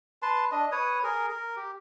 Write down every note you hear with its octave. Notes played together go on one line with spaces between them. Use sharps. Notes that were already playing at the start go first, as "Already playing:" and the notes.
B4 A5 C6
D4 D#5
B4 C#5 D#6
G#4 A#4
A#4
G4